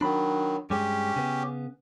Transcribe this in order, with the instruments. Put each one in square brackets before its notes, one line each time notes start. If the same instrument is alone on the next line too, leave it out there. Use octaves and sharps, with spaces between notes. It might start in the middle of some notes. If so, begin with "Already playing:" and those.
[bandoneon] D#3 F#3 [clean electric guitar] D4 B5
[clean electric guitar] G2 G#3 [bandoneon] C#4 G4
[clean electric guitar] C#3 B3